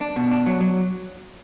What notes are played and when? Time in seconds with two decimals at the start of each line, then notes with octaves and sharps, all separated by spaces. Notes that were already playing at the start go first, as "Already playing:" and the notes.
0.01 D4
0.16 B2
0.31 D4
0.46 F#3
0.61 F#3